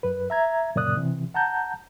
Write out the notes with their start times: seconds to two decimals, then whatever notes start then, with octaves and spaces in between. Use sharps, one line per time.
0.03 F#2 B4
0.30 E5 A#5 G#6
0.75 F#2 A#2 C#3 D5 D#6 F#6
0.97 C3 E3
1.34 F#5 A5 A#5 G6